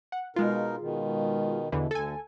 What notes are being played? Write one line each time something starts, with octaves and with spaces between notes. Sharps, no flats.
F#5
B2 G#3 D#4 F4 A#4
B2 D#3
E2 B2 D3 E3
D2 D3 A4 G#5